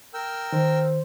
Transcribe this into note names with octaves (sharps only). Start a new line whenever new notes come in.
A#4 G5 E6
D#3 C5